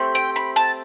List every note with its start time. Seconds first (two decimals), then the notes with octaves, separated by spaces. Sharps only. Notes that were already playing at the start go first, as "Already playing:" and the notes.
Already playing: A3 C4 G4
0.15 G5
0.36 B5
0.56 A5